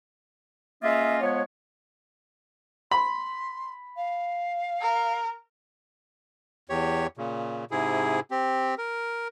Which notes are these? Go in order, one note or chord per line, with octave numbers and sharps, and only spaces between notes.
G#3 A#3 C#4 F4 D#5 E5
F3 G#3 B3 C#5
B5 C6
F5
A#4
E2 G4 C#5
A#2 C#3
G#2 C3 E4 G#4
C4 G4
A#4